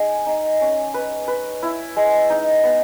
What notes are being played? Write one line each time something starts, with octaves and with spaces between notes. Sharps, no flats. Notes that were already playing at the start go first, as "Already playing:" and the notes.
Already playing: D#4 G#4
D#4
C#4
B4
B4
E4
G#3
D#4
B3